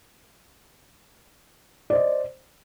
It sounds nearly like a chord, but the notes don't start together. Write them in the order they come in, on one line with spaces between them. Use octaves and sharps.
D5 C5 D#5